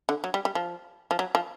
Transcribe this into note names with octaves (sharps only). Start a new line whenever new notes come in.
D3
F#3
G3
G3
F3
F3
F#3
F3